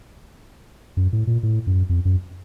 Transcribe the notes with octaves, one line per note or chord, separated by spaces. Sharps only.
F#2
A2
A#2
A2
F#2
F2
F#2